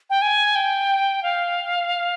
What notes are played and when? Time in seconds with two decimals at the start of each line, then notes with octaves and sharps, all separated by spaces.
0.10 G5
0.22 G#5
0.55 G5
1.23 F5